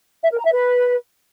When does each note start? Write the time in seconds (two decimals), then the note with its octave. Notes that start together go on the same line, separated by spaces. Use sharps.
0.24 E5
0.31 A#4
0.38 A#5
0.45 E5
0.52 B4